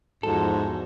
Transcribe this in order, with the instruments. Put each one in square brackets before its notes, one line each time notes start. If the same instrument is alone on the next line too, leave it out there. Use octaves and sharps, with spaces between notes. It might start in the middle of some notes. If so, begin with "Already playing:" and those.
[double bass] E2 F3 [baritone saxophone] G#2 [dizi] F#4 [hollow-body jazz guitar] A4